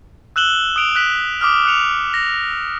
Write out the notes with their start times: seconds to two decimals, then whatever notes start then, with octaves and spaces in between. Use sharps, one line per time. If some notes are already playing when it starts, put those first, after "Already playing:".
0.36 E6 F#6 E7 F#7 G7
0.76 D#6 F#6 D7 F7
0.96 F#6 B6 F#7
1.41 D6 D#6 F6
1.65 F#6 C#7 F7
2.14 A#6